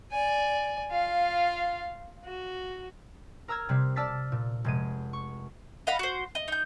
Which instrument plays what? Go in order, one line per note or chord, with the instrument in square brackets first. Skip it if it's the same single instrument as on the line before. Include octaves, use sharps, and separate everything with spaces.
[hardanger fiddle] D5 G#5
F4 F5
F#4
[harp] A#4 A#5 E6 F6 G#6
C3 G3 C4
D5 A5 E6 F6 A6 B6
A#2
F1 G#3 D#7
C#6
[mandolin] D#5 F5 F#5 B5
F#4 C5
D#5
D#4 G6